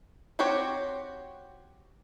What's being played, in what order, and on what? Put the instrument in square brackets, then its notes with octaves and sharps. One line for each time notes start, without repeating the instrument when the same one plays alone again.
[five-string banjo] C4 F#4 G4 C5 C#5